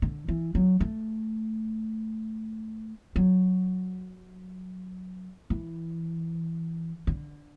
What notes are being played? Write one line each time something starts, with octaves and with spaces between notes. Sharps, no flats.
D3
E3
F#3
A3
F#3
E3
D3